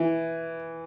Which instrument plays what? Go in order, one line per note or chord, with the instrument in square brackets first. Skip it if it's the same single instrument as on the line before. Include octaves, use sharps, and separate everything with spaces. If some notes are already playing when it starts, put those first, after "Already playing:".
Already playing: [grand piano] E3